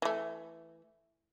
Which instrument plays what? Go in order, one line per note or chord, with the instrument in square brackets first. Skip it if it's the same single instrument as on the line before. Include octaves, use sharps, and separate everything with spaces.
[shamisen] E3 A3